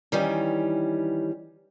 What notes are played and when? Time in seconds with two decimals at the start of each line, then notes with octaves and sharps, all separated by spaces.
0.12 D#3 E3 G3 C#4